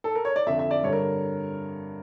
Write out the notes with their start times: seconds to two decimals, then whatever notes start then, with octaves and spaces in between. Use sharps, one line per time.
0.04 A4
0.15 A#4
0.25 C#5
0.36 D5
0.46 F2 D3 E5
0.59 E5
0.71 D5
0.83 G2 C#5
0.87 D3
0.93 A#4